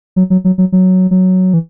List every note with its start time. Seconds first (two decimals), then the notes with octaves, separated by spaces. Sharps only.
0.16 F#3
0.30 F#3
0.44 F#3
0.58 F#3
0.72 F#3
1.11 F#3
1.54 E3